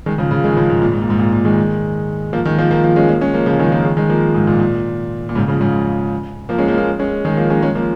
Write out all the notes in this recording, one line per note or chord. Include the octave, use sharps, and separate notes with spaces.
D#3 G#3
C#3 F3
C#3 F3
D#3 G#3
C#3 F3
G#2
A#2
G#2
A#2
G#2
A#2
A#2
D#3 G#3
F3 A#3
D#3 G#3
F3 A#3
F3 A#3
F3 A#3
G#3 C#4
F3 A#3
G#3 C#4
F3 A#3
C#3 F3
D#3 G#3
F3 A#3
D#3 G#3
D#3 G#3
F3 A#3
G#2
A#2
A#2
A#2
G#2 C#3
C#3 F3
G#2 C#3
F3 A#3
G#3 C#4
F3 A#3
F3 A#3
G#3 C#4
D#3 G#3
F3 A#3
G#3 C#4
G#3 C#4
F3 A#3